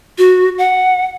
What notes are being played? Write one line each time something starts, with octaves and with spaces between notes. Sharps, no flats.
F#4
F#5